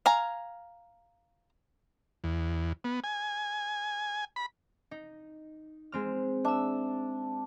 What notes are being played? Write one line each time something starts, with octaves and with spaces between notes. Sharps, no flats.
F5 G#5 A#5
E2
B3
G#5
B5
D#4
G#3 C4 F6
D4 E5 E6